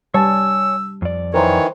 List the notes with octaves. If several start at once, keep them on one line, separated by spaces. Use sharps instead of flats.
G3 C#5 G#5 A5 E6
F2 D5
D#3 E3 A#4 C5 C#5